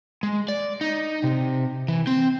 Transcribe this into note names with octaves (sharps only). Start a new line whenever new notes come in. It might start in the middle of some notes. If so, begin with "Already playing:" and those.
G#3
D5
D#4
C3
E3
C4